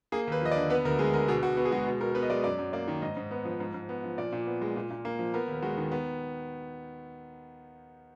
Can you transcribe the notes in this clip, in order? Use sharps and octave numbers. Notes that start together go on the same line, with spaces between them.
A#3 G#4
D#2 B4
F3 D#5
D5
D3
B3 B4
D2 A#4
G#3 G#4
D3 A#4
B2 G#4
B2 F#4
B3
G#4
G#3 F#4
B2
B2 A#4
A#4
B3 B4
D#5
G#3 D5
F#2 D5
F#2
A#3 D5
D#3
G#2 D#5
G#2
B3
F3
G#2
G#2
B3
F3
A#2 D5
A#2
B3
G#3
A#2
A#2
A#3
F3
B3 A#4
D#2
G#3 F#4
D#3
B3